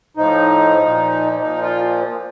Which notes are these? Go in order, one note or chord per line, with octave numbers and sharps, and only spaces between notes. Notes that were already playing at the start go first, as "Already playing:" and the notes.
A2 F3 D#4
A#2 F3
A#2 F3 D#4
F4